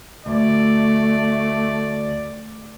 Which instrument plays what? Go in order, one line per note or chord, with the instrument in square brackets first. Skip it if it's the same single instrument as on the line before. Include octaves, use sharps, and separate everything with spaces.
[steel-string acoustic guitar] D2 [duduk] A3 [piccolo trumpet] D5